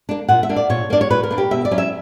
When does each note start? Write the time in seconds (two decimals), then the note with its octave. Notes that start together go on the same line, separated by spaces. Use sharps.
0.09 A#3 D4
0.28 A#2 F#5
0.43 E5
0.49 A#3 D4
0.56 D5
0.70 A#2 C#5
0.90 A#3 D4 D5
1.01 C#5
1.10 A#2 B4
1.23 A#4
1.31 A#3 D4
1.38 G4
1.51 B2 E5
1.65 D5
1.71 F#3 C#4 E4
1.78 E5